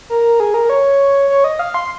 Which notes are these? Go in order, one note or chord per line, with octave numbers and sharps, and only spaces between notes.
A#4
G#4
A#4
C#5
C#5
D#5
F5
C6